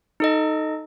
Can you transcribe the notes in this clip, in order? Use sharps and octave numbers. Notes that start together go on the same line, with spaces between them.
D#4 A4 D#5